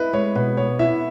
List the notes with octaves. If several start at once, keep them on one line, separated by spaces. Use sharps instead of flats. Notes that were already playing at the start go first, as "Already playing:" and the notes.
Already playing: E4 B4 D#5
G#3 C#5
B2 B4
B3 C#5
E4 E5